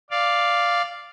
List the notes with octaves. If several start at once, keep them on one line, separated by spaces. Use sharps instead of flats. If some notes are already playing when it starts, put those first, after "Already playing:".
D5 F5